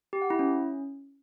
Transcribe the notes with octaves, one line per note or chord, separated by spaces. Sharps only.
G4
F#5
E4
C#4